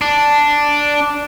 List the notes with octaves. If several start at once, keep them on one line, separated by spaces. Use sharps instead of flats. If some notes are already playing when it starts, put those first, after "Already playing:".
D4